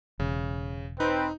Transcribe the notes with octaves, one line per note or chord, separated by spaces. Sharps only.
E1 C#3
C4 D#4 B4